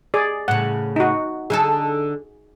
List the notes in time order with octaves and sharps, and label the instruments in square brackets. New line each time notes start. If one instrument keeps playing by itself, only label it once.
[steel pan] G#4 D5
[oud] A2 C#3 [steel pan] F#5
[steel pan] D#4 F#4
[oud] D3 D#4 A4 [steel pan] G#4